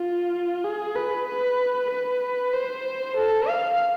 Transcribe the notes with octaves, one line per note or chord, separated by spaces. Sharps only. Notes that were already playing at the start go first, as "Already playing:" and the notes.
Already playing: F4
G#4
B4
B4
B4
C5
A4
F5